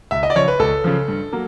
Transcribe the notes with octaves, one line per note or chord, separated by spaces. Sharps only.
C#2 E5
D#5
D5
C#3 F3 C#5
B4
C#2 A4
C#3 F3
G2
F#3 A#3